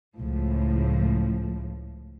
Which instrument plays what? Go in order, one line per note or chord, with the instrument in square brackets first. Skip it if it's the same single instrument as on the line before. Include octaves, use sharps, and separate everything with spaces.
[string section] C#2 A2 F3